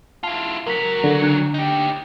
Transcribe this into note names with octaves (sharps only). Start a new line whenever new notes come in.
E4 F4 A5
C#2 F#3 A#4 B6
D3
D4 F#6
D#4 G4